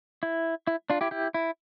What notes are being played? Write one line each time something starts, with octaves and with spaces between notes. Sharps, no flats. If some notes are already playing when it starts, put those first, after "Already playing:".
E4
E4
D4 F4
E4 G4
E4 G4
E4